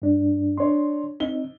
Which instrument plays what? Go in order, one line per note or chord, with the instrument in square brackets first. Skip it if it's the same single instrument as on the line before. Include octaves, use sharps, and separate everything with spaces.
[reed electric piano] G2 D4
[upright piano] D4 C#5 [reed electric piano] C6
[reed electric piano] C4 D#4 [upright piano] G7